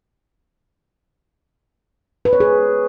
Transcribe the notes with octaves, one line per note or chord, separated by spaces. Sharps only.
B4
C#5
G#4